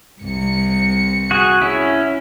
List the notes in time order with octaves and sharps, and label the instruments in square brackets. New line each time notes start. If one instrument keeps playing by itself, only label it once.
[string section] C2 C#7
[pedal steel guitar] F#4 G#4
C#4 E4